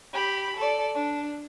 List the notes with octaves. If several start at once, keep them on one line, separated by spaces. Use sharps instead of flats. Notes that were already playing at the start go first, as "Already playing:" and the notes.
G4 B5
A4 D5
D4